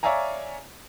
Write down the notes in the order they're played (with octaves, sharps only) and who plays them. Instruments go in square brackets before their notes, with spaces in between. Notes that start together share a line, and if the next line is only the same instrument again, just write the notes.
[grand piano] C#5 D5 E5 F5 G#5 A#5